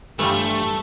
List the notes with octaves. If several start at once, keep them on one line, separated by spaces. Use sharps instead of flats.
G2 E3 F3 G3 A3 C#6